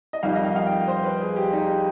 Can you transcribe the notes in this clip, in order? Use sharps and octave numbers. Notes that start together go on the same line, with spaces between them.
D#5
F2 D#3 G3 F5
D#5
F5
F5
G5
C5
B4
G#4
G4
D#4